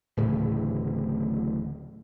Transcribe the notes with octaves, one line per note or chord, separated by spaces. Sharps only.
D1 A2 C#3 E3